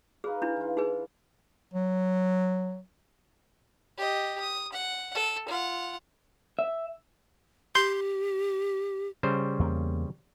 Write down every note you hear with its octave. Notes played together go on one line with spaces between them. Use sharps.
D#4 G#4 B4 F5
D4 E4
E3 F4
D#4 G#4 B4
F#3
G4 D#5
D#6
F#5
A4
F4 F#5
E5
G4 C6 G6
C#3 G3 C5
E2 A#3